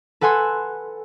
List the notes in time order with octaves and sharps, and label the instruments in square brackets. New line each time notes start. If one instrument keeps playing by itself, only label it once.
[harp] A4 B4 F#5 G#5 C6 E6